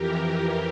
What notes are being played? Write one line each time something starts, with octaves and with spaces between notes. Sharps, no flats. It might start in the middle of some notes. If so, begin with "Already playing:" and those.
Already playing: F2 E3 G4 A#4
G4 A#4